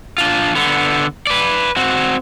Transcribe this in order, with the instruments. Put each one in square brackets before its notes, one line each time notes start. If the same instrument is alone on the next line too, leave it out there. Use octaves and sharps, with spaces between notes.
[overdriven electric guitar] D4 F4
D3 B3
B4 D5
C4 F#4